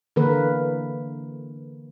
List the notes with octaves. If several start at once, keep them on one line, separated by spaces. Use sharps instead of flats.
D3 E3 A#3 A#4 B4